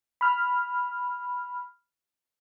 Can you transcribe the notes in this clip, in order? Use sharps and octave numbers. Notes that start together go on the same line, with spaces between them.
B5 F6